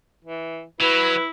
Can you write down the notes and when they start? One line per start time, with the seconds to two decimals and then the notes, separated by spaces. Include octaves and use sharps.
0.25 E3
0.80 F#3 E4 B4